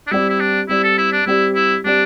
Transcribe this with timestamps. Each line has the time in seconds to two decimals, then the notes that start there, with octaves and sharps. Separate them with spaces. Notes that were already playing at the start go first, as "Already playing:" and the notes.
0.07 D4
0.11 G3 C4 E4 G4 D5
0.30 E4
0.40 D4
0.69 G3 C4 E4 G4 D5
0.84 A4
0.98 E4
1.13 D4
1.26 G3 C4 E4 G4 D5
1.55 E4
1.84 G3 C4 D4 G4 D5